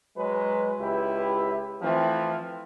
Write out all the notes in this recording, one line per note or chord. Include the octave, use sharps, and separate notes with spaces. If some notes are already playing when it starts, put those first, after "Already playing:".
F#3 G#3 B4
C#2 E4 G4 B4
E3 F3 A3 C4